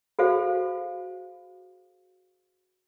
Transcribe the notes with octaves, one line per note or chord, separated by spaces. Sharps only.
F#4 G#4 A4 C5 F5